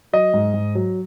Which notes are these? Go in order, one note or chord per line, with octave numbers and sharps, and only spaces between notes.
F#3 D#5
G#2
G#2
F#3